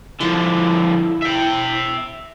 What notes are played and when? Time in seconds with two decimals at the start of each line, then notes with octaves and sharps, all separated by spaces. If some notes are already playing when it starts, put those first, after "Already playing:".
0.21 D3 F3 E4
1.22 E5 G5